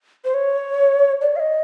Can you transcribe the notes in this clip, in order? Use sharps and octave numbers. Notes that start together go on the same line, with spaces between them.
C5
C#5
D5
F5
D#5